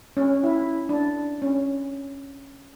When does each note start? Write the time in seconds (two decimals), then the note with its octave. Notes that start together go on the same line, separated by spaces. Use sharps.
0.17 C#4
0.43 E4
0.89 D4
1.42 C#4